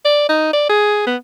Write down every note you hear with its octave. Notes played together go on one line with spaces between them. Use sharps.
D5
D#4
D5
G#4
B3